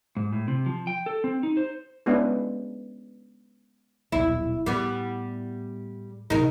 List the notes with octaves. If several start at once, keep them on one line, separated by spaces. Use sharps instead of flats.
G#2
A2
C3
F3
G5
A4
C4
D#4
C5
G#3 B3 C#4 D4 E4
D#1 B1 E4
A2 G3 B3
A2 C3 D#4 A#4